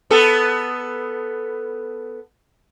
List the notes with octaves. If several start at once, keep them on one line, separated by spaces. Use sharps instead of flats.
B3 A4